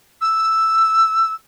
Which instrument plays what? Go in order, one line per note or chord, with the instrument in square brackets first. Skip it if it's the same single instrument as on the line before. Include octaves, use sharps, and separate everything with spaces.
[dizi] E6